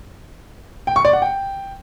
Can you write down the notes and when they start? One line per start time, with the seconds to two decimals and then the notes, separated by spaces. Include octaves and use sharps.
0.87 G5
0.96 C#6
1.05 D5
1.13 F#5
1.22 G5